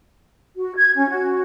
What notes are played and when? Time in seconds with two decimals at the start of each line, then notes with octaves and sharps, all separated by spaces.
0.56 F#4
0.76 G#6
0.96 C#4
1.10 F#4